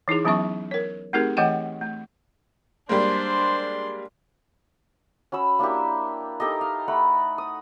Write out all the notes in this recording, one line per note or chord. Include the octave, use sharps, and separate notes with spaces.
E3 D#4 E4 G#4
E3 F#3 B3 C#4 E5 C#6
A#4 C#5
A3 C4 D#4 G4 G#4 A#4
E3 A3 D#5 F#5 G5
A3
G3 G#3 A#3 D4 C5 C6
C#4 F#4 B5 E6
A#3 D4 E4 G4
D#4 G4 A4 D#5
F5
A3 F#5 B5
D#6